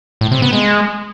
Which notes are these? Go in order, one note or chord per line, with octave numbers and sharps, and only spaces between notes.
A2
C3
B3
G#3